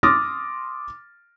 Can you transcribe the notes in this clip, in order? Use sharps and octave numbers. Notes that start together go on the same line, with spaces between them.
C6 D6 D#6 F6 A6 A#6